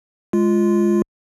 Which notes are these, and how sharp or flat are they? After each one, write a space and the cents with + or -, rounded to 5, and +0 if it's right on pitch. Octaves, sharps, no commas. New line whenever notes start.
G#3 +0 F4 -10